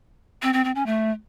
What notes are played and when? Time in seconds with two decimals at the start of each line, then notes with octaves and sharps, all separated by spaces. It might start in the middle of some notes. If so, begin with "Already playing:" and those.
0.42 C4
0.53 C4
0.64 C4
0.75 C#4
0.86 A3